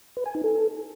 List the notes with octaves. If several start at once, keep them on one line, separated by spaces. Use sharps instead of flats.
B4
G#5
D#4
A4